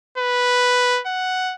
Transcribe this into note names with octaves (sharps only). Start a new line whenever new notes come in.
B4
F#5